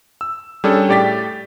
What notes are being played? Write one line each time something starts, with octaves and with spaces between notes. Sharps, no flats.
E6
G3 C#4 D4 G#4 A4
A2 G4 D5 G5 A6 B6